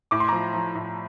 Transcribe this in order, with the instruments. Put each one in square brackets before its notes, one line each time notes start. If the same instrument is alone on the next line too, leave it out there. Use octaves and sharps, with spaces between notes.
[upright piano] A2 D6
C6
F3 A#5 D6
F3
A2